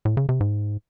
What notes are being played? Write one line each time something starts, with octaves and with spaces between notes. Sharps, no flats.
A2
C#3
C3
G#2